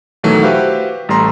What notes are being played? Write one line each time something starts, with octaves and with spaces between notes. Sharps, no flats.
B2 D#3 E3 F#3 A3
F#4 G4 B4 C5 E5 F5
A1 G3 A3 A#5 C6